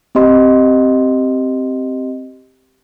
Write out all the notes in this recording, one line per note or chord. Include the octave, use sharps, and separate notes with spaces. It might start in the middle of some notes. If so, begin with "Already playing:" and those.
C4 G4 D#5 C6